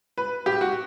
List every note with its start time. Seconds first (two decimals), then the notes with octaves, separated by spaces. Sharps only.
0.18 B4
0.46 G4
0.61 F#4